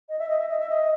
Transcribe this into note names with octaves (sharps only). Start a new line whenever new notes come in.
D#5
E5
D#5
E5
D#5
E5
D#5